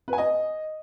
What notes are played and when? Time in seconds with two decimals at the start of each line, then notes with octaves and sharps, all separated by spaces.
0.08 B4
0.13 G#5
0.18 D#5